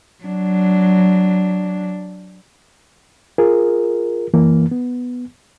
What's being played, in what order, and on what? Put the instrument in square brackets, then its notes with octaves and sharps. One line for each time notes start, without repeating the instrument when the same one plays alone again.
[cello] F#3 D4
[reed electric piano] F4 G#4 A#4
F#2 E3 A#3
B3